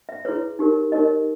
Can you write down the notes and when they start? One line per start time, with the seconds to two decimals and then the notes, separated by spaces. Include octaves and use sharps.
0.09 E5
0.25 E4 G#4 B4 C#5
0.59 D#4 G4 A#4 C#5
0.92 D#4 G4 A#4 C#5 D#5